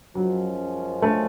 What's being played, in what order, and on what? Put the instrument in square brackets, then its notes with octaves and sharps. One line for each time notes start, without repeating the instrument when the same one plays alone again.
[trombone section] F#2 F3 G#3 C#4 [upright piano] F#3
[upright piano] A3